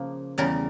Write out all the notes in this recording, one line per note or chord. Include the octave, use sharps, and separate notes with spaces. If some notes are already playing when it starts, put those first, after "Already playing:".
Already playing: C#3 F3 A#3
E2 C#3 G3 A#4